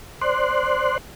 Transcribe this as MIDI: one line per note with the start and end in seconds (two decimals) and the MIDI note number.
0.21 0.98 72
0.21 0.98 74
0.21 0.98 84
0.21 0.98 90